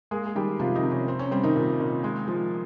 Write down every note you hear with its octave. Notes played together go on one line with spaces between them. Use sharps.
G#3 A#3 G#4
G#4
D#3 G3 G4
C3 F3 F4
D#3 D#4
C3
C#4
C4
C#4
G3 C4
D#3 D#4
A#2
A#2
G#3
F3